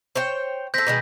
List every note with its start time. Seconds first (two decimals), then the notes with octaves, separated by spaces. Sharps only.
0.15 C5 C#5 G5
0.74 C4 A4 G6 A#6 B6
0.87 B2 D#3 G#3